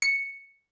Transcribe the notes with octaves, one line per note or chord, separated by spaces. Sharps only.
C#7